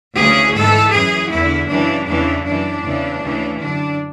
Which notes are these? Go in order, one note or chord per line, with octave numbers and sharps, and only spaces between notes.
D2 C#3 E3 G#4
G#2 E3 A4
F#2 E3 G#4
E2 D3 E4
F#2 C#3 E3 D4
E2 C#3 E3 D4
F#2 E3 D4
E2 C#3 E3
D2 C#3 E3
F#2 D3 D4